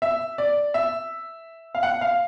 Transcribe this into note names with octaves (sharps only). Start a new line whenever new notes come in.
E5
D5
E5
F5
F#5
F5